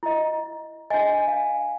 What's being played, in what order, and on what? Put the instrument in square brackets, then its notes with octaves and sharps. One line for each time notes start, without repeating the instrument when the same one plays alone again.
[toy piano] E4 D#5
[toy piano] D4 D#5 [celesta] G#5
[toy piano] F5